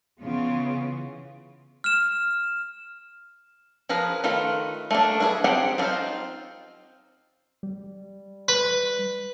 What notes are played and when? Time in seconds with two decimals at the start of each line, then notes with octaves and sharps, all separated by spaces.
0.22 C#3 E3 B3 F4
1.84 F6 E7
3.89 F3 G#4 A#4 B4
4.24 D#3 A3 F4 B4
4.91 A3 A#3 D4
5.20 D4 E4 F4 G#4 B4
5.44 C4 D#4 G4 G#4 F#5
5.78 C4 D4 D#4 F4 C5
7.63 G3
8.48 B4